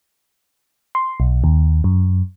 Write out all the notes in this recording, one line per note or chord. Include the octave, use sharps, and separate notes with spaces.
C6
B1
D#2
F#2